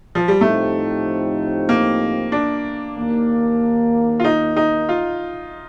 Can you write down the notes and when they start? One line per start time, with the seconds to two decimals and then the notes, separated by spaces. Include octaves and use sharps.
0.15 F3
0.28 G3
0.40 A2 F3 A3 C4 D#4 G4
1.69 A#3
2.32 D4
2.97 D#2 D#3 A#3
4.20 F4
4.24 D#4
4.56 D#4
4.89 F4